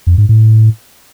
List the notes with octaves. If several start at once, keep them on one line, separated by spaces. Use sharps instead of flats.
F2
G#2
A2